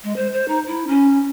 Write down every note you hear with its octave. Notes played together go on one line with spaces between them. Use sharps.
G#3
C5
C5
D#4
E4
C#4